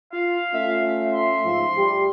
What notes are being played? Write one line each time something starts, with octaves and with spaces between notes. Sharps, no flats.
F4 F5
A3 C#4 F4 E5
C6
G#2 F3 F4
G3 G4